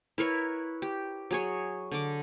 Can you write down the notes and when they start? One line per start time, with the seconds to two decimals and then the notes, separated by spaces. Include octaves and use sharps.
0.18 E4 A#4 B4 C#5
0.82 G4
1.31 F#3 G#4 C#5
1.91 D3 D6